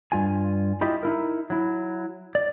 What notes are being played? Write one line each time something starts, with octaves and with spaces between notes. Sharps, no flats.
G2 F4 G#5
E4 F4 G4 D#5 E5
D#4 E4 A#4
F#3 E4
D5